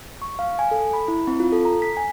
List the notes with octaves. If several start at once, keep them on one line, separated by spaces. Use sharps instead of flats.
C#6
F5
G#5
A4
B5
E4
C4
F4
A4
A#5
B6
G#5